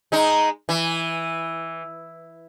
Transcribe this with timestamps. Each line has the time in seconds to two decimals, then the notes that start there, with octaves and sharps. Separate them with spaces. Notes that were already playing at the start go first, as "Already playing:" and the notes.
0.12 G#3 D#4
0.69 E3